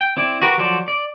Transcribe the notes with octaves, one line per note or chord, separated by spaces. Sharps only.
G5
C4 E4 D5
F#4 G4 A#4 B4
F3 F#3 A4 C5 D5
D5